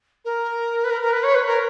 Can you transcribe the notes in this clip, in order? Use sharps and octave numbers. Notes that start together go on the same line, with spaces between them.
A#4
B4
A#4
A#4
B4
C#5
B4
A#4